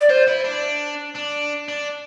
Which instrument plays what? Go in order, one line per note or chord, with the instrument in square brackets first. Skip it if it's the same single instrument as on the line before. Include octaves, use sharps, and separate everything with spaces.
[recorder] D5
[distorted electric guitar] F4 [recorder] C5
[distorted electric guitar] E4
D4
D4
D4